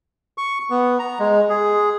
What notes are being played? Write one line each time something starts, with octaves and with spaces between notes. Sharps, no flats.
C#6
B3
A#5
G#3
G#4